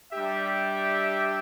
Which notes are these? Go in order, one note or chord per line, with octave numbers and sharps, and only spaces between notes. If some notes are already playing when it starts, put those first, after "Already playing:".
G3 D4 G4 E5